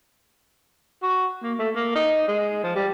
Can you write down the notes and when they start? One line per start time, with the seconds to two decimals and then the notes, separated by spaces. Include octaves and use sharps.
1.02 F#4
1.43 A#3
1.59 A3
1.76 A#3
1.95 D#4
2.28 G#3
2.63 F3
2.76 G3